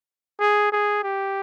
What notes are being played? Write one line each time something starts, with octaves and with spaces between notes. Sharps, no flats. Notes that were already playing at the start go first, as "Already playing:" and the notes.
G#4
G#4
G4